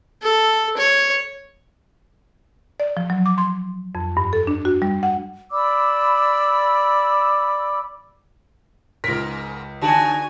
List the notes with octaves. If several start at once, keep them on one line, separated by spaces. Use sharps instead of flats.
A4
C#5
D5
F3
F#3
D6
C6
F2
G2
A4
D4
F#4
G3
F#5
D5 B5 D6 E6
C#2 G#2 A#4 B6
D3 D4 F#4 G#4 G#5 A5